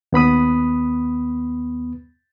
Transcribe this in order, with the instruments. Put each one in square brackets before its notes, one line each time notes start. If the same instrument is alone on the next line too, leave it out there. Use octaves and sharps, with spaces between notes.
[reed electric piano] D#2 B3 B5 D#6